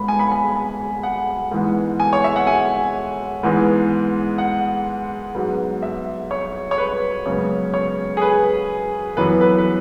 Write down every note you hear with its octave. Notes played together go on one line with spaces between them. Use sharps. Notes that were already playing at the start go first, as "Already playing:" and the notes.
Already playing: G#2 G#3 B3 B5
G#5
B5
G#5
G#5
F#5
G#2 E3 G#3 B3
G#5
C#5
E5
F#5
G#5
G#2 E3 G#3 B3
F#5
G#2 F#3 B3
E5
C#5
C#5
B4
F#2 C#3 G#3 B3 C#5
C#5
G#4
B4
F#2 E3 B3 B4
B4
B4